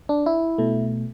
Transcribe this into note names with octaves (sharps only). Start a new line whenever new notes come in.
D4
E4
B2 A3